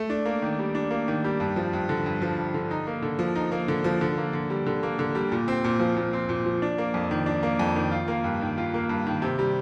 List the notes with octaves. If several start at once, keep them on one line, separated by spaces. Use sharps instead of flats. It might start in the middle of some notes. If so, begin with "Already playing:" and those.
Already playing: A3
D4
A#3
D#3
G3
D4
A#3
D#3
G3
G2
F3
G2
D3
G2
F3
G2
D3
D#4
A#3
D3
F3
D#4
A#3
D3
F3
D3
A#3
D3
G3
D3
A#3
D3
G3
A#2
C4
A#2
F3
A#2
C4
A#2
F3
D4
A#3
F2
D#3
D4
A#3
F2
D#3
F4
A#3
G2
D#3
F4
A#3
G2
D#3
C3
G3